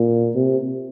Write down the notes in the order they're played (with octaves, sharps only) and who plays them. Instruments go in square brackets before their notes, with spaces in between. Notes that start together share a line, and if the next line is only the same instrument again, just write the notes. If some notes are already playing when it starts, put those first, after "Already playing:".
Already playing: [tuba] A#2
C3